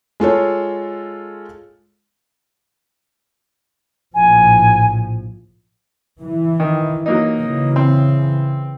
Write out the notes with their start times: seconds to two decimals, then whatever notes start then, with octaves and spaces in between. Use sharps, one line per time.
0.20 G#3 F4 A4 C#5
4.15 A#1 A2 F3 G#5
6.21 E3
6.60 D#3
7.06 F#3 A#3 D#4
7.40 C#3 E3
7.76 C4